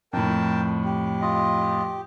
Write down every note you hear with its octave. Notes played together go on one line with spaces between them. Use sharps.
F2 A2 A#4 G5 A5
G4
F4 D#5